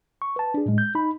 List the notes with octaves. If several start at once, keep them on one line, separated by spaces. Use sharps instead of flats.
C#6
B4 A5
D4 G#4
A2 G#3
G6
D#4 B5